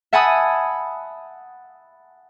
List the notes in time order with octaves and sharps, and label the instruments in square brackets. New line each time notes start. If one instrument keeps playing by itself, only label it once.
[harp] E5 F#5 G#5 A5 B5 D#6